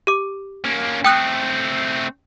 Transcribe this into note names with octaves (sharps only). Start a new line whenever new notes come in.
G4 D6
A#3 C#4
A3 C4 G5 D#6 F#6